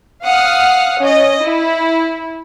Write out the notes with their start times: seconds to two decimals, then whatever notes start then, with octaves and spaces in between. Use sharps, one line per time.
0.23 F5 F#5 D#6 F6
1.00 C#4 D#5
1.41 E4